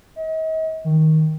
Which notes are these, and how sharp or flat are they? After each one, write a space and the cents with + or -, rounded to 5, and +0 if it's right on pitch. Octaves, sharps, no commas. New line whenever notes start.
D#5 +40
D#3 +15